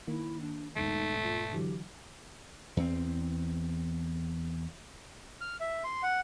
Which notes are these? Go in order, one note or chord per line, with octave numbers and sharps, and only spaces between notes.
D#3 A#3 E4
D4
E1 G#2 A3 D#4
F4
D3 E3 F#3 G4
E2 C4
F6
E5
C6
F#5